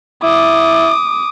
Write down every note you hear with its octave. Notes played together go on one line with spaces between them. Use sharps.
E4 D6 D#6